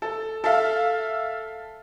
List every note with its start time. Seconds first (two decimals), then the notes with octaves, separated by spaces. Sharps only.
0.02 A4
0.44 A4 E5 F5